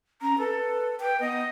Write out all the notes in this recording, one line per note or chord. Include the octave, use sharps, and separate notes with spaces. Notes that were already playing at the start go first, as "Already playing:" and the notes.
C#4 A#5
A4 B4
B4 G5
B3 D#5